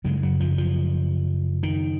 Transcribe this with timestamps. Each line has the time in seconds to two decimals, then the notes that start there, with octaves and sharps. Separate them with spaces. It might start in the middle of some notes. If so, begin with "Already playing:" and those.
0.04 F#2 C#3 G#3
0.23 F#3
0.40 F3
0.58 F3
1.63 D#3